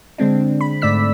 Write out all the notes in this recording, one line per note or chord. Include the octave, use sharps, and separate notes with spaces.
D3 G#3 C4 D4
B5
G#2 A3 D5 E6 B6